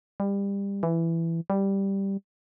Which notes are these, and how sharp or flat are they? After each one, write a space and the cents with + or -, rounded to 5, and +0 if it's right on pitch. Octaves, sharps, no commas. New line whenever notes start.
G3 +25
E3 +10
G3 +0